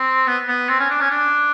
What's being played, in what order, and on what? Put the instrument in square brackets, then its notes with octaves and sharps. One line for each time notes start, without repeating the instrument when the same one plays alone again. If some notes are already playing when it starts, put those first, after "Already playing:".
Already playing: [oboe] C4
B3
B3
C4
C#4
D4
C#4
D4